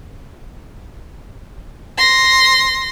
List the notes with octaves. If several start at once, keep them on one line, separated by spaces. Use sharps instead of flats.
C6 A#6